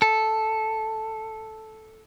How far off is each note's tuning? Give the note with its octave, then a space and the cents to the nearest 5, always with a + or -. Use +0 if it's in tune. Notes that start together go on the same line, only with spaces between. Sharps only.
A4 -5